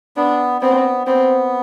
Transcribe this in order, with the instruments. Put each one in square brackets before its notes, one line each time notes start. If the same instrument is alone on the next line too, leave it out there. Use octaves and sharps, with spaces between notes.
[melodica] B3 [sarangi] D4
[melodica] B3 [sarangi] C4
[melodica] B3 [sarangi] C4